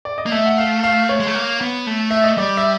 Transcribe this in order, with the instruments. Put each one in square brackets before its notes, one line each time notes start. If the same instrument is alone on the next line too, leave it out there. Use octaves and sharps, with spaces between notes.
[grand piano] D5
D#5
[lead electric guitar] A#3
[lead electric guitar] A3 [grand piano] E5
[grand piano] F#5
F5
F5
C#5
[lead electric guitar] G#3
A3
A#3
B3
A3
[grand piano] E5
D#5
[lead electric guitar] G3 [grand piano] D5
[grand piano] E5